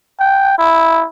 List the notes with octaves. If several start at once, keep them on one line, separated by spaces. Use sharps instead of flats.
G5
E4